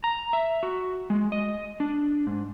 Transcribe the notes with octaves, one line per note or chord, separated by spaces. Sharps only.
A#5
E5
F#4
G#3
D#5
D4
G#2